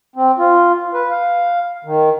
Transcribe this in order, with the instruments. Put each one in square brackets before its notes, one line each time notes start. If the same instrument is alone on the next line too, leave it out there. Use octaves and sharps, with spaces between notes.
[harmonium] C4
F4
B4
F5
D#3